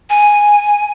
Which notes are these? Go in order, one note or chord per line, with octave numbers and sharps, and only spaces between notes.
G#5